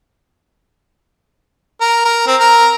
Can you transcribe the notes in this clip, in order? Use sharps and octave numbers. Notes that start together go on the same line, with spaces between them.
A#4
A#4
C4
A#4